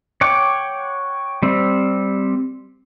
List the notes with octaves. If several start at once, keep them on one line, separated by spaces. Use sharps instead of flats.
C#5 F#5 G5 D6
G3 C4